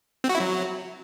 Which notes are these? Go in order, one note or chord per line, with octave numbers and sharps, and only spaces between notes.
C4
F#4
E4
F#3